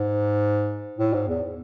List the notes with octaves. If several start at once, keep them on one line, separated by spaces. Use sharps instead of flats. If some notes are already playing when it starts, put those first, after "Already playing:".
Already playing: G#2
A2
G#2
E2